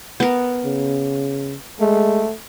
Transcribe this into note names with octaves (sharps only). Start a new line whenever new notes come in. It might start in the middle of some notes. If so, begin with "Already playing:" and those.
B3 A#4
C#3
G#3 A3